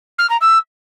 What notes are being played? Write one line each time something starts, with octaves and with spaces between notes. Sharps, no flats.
F6
A#5
E6